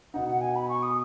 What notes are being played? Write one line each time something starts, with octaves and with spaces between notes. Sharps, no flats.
B2 B3 D#4 F#5
F#5
G#5
B5
C#6
D#6